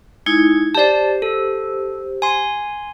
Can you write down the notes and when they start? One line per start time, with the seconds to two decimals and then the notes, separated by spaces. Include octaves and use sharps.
0.26 G#3 D#4 E4 G#6
0.75 G4 C5 D5 A5
1.22 A4
2.22 G#5 C6